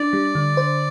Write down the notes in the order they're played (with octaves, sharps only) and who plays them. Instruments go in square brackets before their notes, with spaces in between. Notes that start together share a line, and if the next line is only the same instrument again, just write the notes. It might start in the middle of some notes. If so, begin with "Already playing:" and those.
Already playing: [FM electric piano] D4 [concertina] D5
[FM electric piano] G3
D3
C5